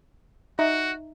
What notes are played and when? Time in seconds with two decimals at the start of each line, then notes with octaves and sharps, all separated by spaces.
0.59 D#4 F#4 E5